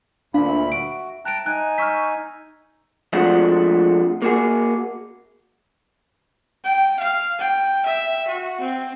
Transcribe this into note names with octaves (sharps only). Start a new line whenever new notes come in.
D2 A#2 D4 F5 B5
E5
F#4 D7
G5 A5 A#5 F#6 D7
D#4 G#5 F#6
C#6 E6 F6 G6 B6
F3 G#3 A3 C4 D4 F#4
A#3 F#4 G#4
G5
F5
G5
E5
F#4
C4